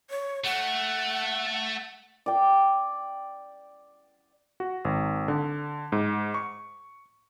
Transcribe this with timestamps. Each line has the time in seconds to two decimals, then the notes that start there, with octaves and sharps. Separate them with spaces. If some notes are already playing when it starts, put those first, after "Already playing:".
0.10 C#5
0.44 A3 F#5
2.26 D5 G5
4.60 F#4
4.85 G#1
5.28 D3
5.92 G#2
6.34 C#6